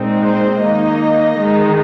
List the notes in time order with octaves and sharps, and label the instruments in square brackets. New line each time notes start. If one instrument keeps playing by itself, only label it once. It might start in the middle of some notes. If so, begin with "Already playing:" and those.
Already playing: [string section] A#2 G#3 C4 D#4
C5
D#3 A#3 D#4 D#5
D#3 G#3 D#4